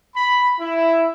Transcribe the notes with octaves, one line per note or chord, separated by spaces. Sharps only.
B5
E4